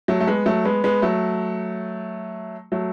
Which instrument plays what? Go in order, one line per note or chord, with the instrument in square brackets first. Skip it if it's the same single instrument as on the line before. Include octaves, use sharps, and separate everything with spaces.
[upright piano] F#3 A3
A3
G#3 B3
F#3 A3
G#3 B3
G#3 B3
F#3 A3
F#3 A3